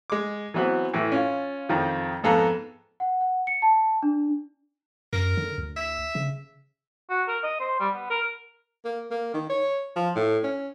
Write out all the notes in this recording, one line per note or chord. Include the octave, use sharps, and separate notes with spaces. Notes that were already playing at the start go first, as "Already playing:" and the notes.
G#3 D6
E3 F#3 B3 C4 F#4
A2 E3
C#4 F4
F2 D#3 F3
F2 G#2 B3 A4 F5 A#5
F#5
F#5
C#7
A5
D4
F#2 A#4
D3
D2
E5
C#3
F#4
A#4
D#5
C5
G3
B3
A#4
A#3
A#3
D#3
C#5
F3
A2
C#4